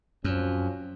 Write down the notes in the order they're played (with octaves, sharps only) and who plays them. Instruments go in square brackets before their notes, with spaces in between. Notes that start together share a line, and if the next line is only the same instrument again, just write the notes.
[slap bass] F#2 [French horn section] F3 C4 C#4